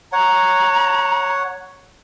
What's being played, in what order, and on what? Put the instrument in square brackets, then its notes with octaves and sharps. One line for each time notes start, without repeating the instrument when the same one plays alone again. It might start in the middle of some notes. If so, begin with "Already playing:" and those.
[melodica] C#5 F#5 [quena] A#5